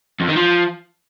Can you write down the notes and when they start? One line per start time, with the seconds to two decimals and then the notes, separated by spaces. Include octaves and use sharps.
0.20 F2
0.28 D#3
0.36 F3